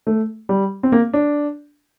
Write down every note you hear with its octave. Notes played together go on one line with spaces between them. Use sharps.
A3
G3
C4
A#3
D4